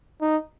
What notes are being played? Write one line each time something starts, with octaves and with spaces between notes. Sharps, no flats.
D#4